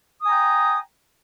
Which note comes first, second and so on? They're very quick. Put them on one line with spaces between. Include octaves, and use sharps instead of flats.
D#6 G#5 A#5 G5